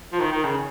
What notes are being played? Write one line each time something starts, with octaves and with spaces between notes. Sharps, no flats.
F3
D#3
D#3
C#3